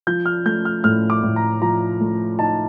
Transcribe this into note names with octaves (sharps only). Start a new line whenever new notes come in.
F3 G6
F6
A3 G6
F6
A2 F6
D6
A2
A#5
F3 A#5
A3
D#4 A5